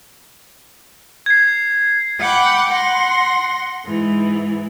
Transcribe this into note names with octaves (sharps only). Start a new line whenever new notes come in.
G#6 C7
F#5 G5 B5 D6 G6
F#5 C6 A#6
G#2 E3